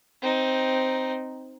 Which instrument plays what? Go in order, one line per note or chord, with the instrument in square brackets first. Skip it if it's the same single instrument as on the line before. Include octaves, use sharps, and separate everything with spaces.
[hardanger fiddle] C4 D#4